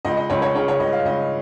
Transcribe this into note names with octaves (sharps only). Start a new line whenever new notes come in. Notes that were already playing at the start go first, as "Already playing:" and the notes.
C#2 D#5
D#5
C#2 C#5
C#5
C#3 C#5
C#5
C#2 D#5
F5
C#2 D#5